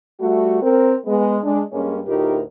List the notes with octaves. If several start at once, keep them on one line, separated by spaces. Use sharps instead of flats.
G3 A3 F#4
C4 A#4
G#3 B3
G#3 D4
G2 G#3 A#3 C#4
D2 A2 D#4 F4 G4 A#4